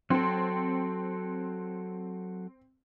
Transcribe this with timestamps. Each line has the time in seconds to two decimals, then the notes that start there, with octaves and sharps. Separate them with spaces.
0.10 F#3 C4 A4